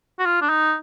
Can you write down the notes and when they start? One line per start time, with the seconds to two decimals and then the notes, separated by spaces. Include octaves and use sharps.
0.19 F#4
0.25 F4
0.42 D4
0.49 D#4